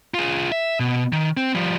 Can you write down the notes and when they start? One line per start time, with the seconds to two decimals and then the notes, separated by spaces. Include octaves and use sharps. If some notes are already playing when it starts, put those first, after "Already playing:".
0.14 F4 G#4
0.52 E5
0.80 B2
1.13 D#3
1.37 C4
1.55 F3 G3